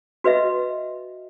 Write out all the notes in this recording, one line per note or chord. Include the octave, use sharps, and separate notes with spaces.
F#4 B4 D#5 E5